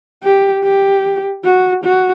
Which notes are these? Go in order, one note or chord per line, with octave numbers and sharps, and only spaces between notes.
G4
G4
F#4
F#4